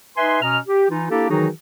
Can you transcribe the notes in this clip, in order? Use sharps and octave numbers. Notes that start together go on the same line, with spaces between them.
D#4 B4 E5 G#5 C6
B2 C#4 D#5 A#5 F6
G4
E3 D#4 F4
A#3 D4 E4 G4 A4
D#3 E3 F#3 D#4 F#4 G#4